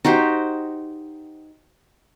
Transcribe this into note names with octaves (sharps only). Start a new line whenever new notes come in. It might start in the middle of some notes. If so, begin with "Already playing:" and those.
D#4 F#4 G4 C5